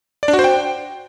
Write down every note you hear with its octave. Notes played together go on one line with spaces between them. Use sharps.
D5
D4
F#4
C5
G5